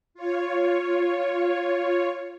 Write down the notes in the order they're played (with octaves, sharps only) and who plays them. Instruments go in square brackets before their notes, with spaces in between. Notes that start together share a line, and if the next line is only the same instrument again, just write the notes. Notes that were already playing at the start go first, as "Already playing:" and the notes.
[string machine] F4 C#5